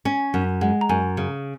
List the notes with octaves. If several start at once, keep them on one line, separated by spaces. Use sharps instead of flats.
C#4 G#5
F#2
G#3 F#5
A#5
F#2 G#5
C#3